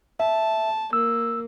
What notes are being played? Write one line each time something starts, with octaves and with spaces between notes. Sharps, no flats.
E5 A5
A#3 E6